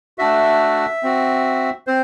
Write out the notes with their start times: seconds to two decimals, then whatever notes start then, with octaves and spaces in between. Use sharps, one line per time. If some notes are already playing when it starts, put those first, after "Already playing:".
0.18 A3 D4 F#4 E5
1.03 C4 F#4
1.87 C4 C5